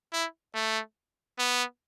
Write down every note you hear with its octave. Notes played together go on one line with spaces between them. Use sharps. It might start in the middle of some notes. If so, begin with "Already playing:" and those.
E4
A3
B3